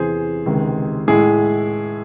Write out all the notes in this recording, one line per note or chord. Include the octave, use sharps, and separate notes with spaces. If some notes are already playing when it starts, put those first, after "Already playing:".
Already playing: E2 C3 E3 G#4 C5
C#2 C3 D#3 G#3
A2 G#3 E4 G#4